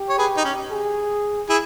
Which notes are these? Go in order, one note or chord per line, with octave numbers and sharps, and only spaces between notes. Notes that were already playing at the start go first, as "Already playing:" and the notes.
Already playing: G4
C#5
G#4 B4
D#4
C#4
G#4
E4 G#4